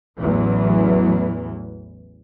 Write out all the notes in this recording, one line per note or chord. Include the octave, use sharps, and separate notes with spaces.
A1 E2 E3 F#3